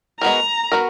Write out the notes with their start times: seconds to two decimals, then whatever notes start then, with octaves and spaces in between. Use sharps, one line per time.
0.21 G#3 B3 F#4 A#4 A#5
0.72 B3 F#4 A#4